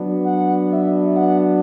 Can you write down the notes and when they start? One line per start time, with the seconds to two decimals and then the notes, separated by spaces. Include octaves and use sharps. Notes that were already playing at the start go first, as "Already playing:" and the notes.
Already playing: F#3 B3 D4
0.25 F#5
0.71 E5
1.16 F#5